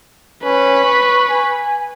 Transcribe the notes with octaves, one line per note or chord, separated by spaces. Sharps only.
C#4 B4
C#6
G#5